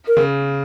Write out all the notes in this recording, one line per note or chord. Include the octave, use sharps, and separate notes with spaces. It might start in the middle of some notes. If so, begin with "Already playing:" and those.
A#4
C#3